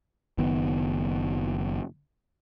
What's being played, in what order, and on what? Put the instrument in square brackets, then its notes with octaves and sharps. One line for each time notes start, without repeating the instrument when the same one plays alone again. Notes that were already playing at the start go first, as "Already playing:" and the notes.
[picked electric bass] F#1 D#3 B3